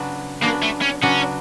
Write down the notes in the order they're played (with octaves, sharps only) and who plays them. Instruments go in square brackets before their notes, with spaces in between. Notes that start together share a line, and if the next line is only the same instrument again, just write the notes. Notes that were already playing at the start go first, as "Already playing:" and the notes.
Already playing: [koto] C#3 F#3 B3 D4 F#4
[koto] C#3 F#3 B3 D4 F#4 [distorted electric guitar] A#3
[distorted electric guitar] A3
C#4
[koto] C#3 F#3 B3 D4 F#4 [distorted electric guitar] C#4